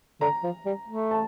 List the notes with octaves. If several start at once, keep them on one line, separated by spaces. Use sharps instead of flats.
D3 A#5
F3
G3
A3
A5